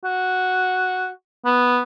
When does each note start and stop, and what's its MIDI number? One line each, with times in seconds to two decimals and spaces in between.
0.04 1.09 66
1.45 1.82 59